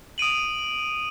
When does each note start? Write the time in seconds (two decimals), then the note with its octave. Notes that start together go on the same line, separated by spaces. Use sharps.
0.18 D#6 D7 D#7 F#7